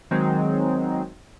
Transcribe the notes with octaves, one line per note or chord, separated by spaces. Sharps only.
D#3 F#3 G#3 C4 D#4